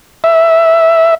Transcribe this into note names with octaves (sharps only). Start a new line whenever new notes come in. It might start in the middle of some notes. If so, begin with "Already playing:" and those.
E5